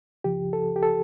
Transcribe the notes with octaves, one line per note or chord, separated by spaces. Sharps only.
C#2 C#3 F3 G4
A4
G4
A4